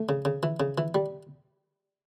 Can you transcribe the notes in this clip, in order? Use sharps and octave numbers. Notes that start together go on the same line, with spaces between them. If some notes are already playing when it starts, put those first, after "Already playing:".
Already playing: A3
C#3
C#3
E3
C#3
E3
G3